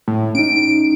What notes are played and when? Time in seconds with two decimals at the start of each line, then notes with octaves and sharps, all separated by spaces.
0.08 A2
0.35 C#4 D#4 D7